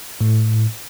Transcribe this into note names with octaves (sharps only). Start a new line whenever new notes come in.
A2